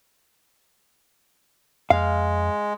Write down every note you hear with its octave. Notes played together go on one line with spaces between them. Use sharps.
F2 G#3 F5